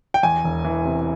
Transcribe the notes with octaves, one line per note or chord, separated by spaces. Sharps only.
G5
E2 G#5
E1
E3
C3